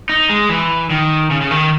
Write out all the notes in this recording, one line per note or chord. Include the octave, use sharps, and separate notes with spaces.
D#4
G#3
E3
D#3
C#3
C#3
D#3